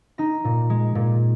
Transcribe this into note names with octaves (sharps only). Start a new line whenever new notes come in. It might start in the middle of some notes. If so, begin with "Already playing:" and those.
D#4 A#5
A#2
G#3
A#2